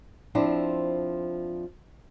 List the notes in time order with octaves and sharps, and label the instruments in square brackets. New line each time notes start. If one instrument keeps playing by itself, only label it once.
[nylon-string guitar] F3 C4 D4 E4